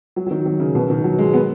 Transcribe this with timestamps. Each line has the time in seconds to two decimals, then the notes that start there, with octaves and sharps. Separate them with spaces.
0.16 F#3
0.26 F#3
0.31 D#3
0.46 D#3
0.60 C#3
0.75 B2
0.90 D#3
1.04 F#3
1.19 G#3
1.33 B3